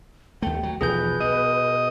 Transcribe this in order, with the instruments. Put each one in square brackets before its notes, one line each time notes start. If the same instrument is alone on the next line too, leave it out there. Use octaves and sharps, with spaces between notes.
[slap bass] D#2 A3 [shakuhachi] G5
[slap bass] F#3
[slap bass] B1 E2 F3 [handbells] G#4 G6 [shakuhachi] B4
[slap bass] B2 [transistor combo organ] D#5